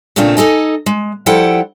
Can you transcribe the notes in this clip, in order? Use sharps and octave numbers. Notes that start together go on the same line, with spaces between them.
A#2 C#3 A3 C4 D4 F4
D#4 A4 D#5 G#5
G#3
F3 G3 E4 A4 F#5 G5